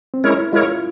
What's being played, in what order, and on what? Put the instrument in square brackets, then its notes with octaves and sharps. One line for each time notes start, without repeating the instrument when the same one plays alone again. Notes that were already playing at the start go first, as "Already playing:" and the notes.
[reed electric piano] C4
[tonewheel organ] G#3 E4 A#4 C#5 [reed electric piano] C#4
[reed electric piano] E4
[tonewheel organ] G#3 E4 A#4 C#5 [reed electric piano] F4